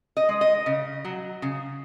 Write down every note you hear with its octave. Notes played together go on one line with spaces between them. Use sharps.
D#5
G#3
D#5
C#3
F#3
C#3